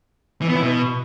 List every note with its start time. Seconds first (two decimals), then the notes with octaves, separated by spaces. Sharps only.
0.41 E3
0.49 B3
0.56 E4
0.63 B2